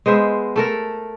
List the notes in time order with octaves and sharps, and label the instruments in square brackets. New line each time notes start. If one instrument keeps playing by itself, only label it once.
[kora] G#3 B3 C5 E5
A3 A4 A#4